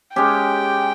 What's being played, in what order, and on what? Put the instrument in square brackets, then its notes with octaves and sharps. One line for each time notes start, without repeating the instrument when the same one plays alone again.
[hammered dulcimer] G#3 C#4 G4 [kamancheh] G5